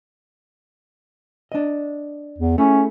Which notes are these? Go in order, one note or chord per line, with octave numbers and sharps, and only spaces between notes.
D4 D#5
E2
A3 C#4 E4 G#4